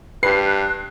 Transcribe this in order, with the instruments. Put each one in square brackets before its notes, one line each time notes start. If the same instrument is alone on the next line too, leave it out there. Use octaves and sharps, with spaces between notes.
[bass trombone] G2 [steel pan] G4 B4 [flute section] F#6 [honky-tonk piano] C7